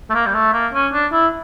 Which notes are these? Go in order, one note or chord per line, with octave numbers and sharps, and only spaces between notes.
A3
A#3
G3
A3
A#3
C#4
D4
E4